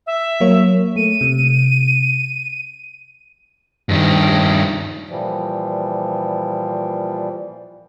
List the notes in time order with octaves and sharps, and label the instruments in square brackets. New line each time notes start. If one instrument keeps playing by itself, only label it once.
[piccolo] E5
[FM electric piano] F#3 A#3 C#5
[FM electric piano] A3 [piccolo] D#7
[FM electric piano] C3
[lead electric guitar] G2 D#3
[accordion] A#2 E3 F3 G3